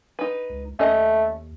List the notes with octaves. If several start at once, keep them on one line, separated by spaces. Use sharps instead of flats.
D#4 B4
C#2
D#2 A3 C#4 D#5